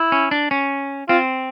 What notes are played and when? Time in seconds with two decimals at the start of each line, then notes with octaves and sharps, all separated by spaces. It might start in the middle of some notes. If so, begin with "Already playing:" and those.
Already playing: E4
0.12 C#4
0.31 D4
0.51 C#4
1.09 C4 F4